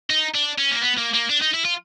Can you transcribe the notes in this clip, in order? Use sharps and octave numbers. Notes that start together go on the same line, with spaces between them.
D#4
D4
C#4
A#3
B3
A#3
A#3
D4
D#4
E4
F4